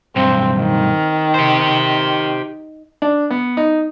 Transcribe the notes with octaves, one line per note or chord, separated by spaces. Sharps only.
B1 G2 C4
D#3
G4 C5
D4
B3
D#4